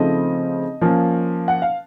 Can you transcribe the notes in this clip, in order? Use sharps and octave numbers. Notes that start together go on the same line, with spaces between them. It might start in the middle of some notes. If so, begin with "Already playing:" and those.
Already playing: C#3 F3 A3 C4 D#4 D#5
F3 A#3 C#4
F#5
F5